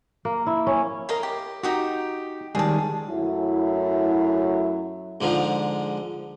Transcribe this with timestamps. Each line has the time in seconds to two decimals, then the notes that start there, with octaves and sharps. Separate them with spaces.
0.25 A#3
0.47 E4
0.67 C#4
1.09 A#4 D#5 F5
1.23 G4
1.63 D#4 F#4 G4 D#6
2.55 D#3 G3 G#3 G#4 A5
3.10 F#2 F#3 A3 E4
5.21 G#2 D3 F3